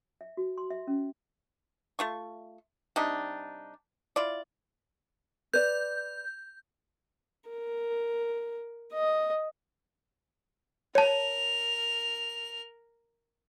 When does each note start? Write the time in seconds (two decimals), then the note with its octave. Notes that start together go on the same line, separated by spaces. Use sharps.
0.21 E5
0.37 F#4
0.58 C6
0.70 E5
0.87 C#4
1.99 A3 F4 C#6
2.96 C3 G3 D4 D#4
4.16 E4 F4 D5
5.54 B4 D5 G6
7.50 A#4
8.93 D#5
10.95 A#4 C#5 A5 F7